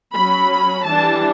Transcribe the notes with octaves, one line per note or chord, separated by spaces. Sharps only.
F#3 C#4 B5
E3 G3 D4 A5